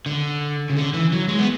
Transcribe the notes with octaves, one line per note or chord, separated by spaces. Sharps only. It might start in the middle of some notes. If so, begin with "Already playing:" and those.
D3
C#3
D3
E3
F#3
G#3
B3